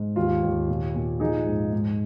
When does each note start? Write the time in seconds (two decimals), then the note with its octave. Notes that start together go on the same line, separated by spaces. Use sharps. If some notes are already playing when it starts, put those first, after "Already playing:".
Already playing: G#2
0.16 D#2 F4
0.43 D#2
0.68 A#2
0.95 A#2
1.20 F3 D#4 G#4
1.46 G#2
1.73 G#2